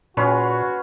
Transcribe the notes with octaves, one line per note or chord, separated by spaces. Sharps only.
A#2 C#4 F#4 B4 C6